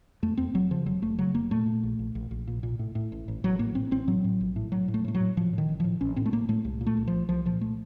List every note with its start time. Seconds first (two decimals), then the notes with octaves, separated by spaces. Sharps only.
0.23 F2 A3
0.38 F2 C4
0.54 F1 F#3
0.71 C#3 F3
0.86 F1 F#3
1.02 F1 A3
1.19 C#3 F#3
1.34 F1 A#3
1.51 A#2 A3
1.66 A#2
1.83 A#1
1.99 A#1
2.15 A#1
2.31 A#1
2.47 A#2
2.63 A#2
2.79 A2
2.95 A2
3.12 A1
3.28 A1
3.44 A1 F#3
3.59 A2 A#3
3.75 A2 C4
3.91 A1 C4
4.07 A2 F#3
4.24 A2
4.41 A#1
4.56 A2
4.72 A2 F#3
4.88 A2
4.94 A3
5.05 A2 A3
5.15 F#3
5.20 A2
5.37 A2 F3
5.53 A2 D#3
5.69 A1
5.80 A2 F3
6.01 A1 C#4
6.16 A2 C4
6.26 A3
6.33 A2 A#3
6.49 A2 A3
6.65 C2
6.81 A#2
6.87 A3
6.97 C2
7.08 F3
7.13 C2
7.29 C2 F3
7.45 A#2 F3
7.61 A3